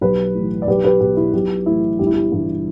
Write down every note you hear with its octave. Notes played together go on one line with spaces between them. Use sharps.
B1 G4 B4
A2 E3
D5
B1 G4 B4
G4 B4
B2 G4
E4
B1 G4
A2 E3 E4
G1 G4
E4
G4
G2 E3